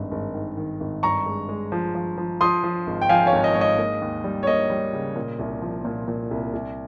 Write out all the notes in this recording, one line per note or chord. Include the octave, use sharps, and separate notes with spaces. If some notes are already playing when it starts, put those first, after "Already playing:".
Already playing: G#1 G2
G#1
D#3
D#3
G#1
G2 A#5 C#6
G#3
G#3
F3
F3
F3
F3 C6 D#6
F3
G#1
G5
F3 F5 G#5
C#5 F5
G#1
D#5
G#2 C#5
D#5
A#3
D#2
G3
C#5
A#3 D#5
G3
C#3
A#2
C2
F3
A#2
A#2
C2
C2